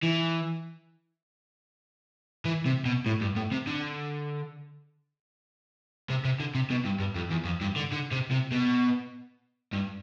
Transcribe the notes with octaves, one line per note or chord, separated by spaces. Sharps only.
E3
E3
C3
B2
A2
G2
A2
C3
D3
C3
C3
D3
C3
B2
G2
G2
F2
E2
F2
G2
D3
D3
C3
C3
B2
G2